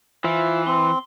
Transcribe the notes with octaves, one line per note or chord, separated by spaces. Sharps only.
E3 F4 C5 E5
C4 C6